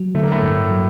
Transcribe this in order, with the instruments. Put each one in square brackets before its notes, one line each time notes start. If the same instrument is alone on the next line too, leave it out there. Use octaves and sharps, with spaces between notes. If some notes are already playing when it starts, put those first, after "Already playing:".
Already playing: [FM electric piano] F#3
[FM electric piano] D3 [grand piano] A3
[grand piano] A#3
A2 A3
[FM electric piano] G2
F#3